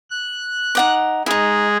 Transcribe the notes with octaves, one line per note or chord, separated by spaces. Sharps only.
F#6
D#4 F#5 D6
G#3 D#4 E4 G#4